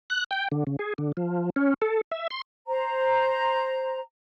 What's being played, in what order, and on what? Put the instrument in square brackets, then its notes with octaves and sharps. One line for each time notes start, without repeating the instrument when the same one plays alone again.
[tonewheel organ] F#6
G5
D3
C#3
G#4
D3
F3
C#4
A4
E5
C6
[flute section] C5 A#5